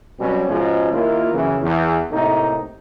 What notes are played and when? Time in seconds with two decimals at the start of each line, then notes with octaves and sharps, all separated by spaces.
0.20 B2 F#3 G3 C4 C#4
0.49 G#2 B2 F3 G#3 C#4
0.92 D#2 A#3 E4 F4
1.32 F#2 C#3 E3
1.61 E2
2.11 A2 C3 A#3 D#4